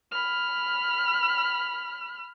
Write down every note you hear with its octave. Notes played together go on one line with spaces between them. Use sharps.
B5 F6